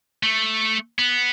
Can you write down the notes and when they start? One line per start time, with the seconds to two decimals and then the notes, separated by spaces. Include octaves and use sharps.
0.23 A3
0.99 B3